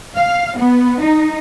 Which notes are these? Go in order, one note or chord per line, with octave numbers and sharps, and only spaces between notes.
F5
B3
D#4